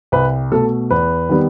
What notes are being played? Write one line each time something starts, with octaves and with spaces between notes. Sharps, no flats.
C2 B4
B2 A3 A4
E2 B4
D#3 G3 B3